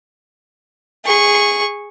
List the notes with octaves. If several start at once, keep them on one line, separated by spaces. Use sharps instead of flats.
G#4 C#6